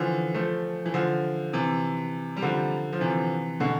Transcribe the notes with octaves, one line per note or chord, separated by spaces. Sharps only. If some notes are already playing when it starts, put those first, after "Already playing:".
Already playing: D3 E3 F3
F3 A3
E3
D3 F3
C3 E3
G3
D3 F3
F3
C3 E3
B2 D3